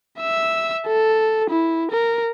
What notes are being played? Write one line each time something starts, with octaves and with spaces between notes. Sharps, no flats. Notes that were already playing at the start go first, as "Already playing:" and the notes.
E5 E6
A4
E4
A#4